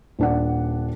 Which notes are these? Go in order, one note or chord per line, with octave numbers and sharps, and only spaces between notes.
D#1 D4 F#5